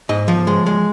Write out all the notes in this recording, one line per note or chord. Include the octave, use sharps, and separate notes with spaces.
G#2 D#5
F3
G#3
G#3